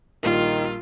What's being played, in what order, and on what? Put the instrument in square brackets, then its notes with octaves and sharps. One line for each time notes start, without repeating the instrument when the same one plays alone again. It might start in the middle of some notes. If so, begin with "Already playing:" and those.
[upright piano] A#1 G3 A#3 [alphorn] D#3 [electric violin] F4